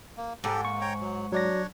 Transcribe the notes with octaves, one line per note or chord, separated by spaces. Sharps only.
A#3
G#2 G4 A4
A#3 C#6
C#5 G5 A#5
F#3
F#3 D4 C#5 D5 A#6